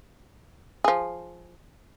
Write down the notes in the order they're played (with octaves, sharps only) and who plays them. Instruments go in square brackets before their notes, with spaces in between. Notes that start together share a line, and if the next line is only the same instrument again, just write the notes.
[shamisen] F3 G#4